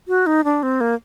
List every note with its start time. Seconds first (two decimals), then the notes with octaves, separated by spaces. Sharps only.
0.08 F#4
0.26 D#4
0.44 D4
0.63 C4
0.81 A#3